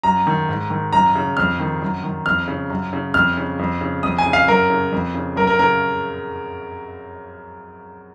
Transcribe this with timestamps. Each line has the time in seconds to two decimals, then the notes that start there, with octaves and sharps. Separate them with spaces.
0.03 F#2 A#5
0.27 D#3
0.49 G#2
0.70 D#3
0.93 F#2 A#5
1.15 C#3
1.37 F2 F6
1.60 D#3
1.82 F#2
2.04 D#3
2.26 F2 F6
2.48 C#3
2.70 F#2
2.93 C#3
3.14 F2 F6
3.37 C#3
3.59 F2
3.81 C#3
4.03 F2 D#6
4.18 G#5
4.26 C#3
4.33 F5
4.48 F#2 A#4
4.70 C#3
4.92 F2
5.14 C#3
5.36 F#2 A#4
5.47 A#4
5.59 C#3 A#4